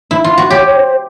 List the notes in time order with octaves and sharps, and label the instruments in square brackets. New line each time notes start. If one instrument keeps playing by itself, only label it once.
[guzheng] E4
F4
F#4
[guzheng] G4 [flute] C#5
[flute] C#5
C5